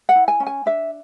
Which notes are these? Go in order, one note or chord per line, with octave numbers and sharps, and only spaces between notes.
F#5
E4
G#5
C#4
G#5
D4 E5